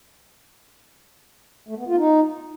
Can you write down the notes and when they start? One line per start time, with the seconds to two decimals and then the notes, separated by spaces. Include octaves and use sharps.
1.68 A3
1.78 B3
1.87 F4
1.97 D#4